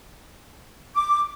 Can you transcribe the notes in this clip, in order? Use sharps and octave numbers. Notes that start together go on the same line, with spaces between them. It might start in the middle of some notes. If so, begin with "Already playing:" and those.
D6